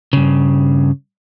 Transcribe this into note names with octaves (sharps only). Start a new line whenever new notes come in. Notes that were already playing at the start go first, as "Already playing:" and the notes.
G2 C#3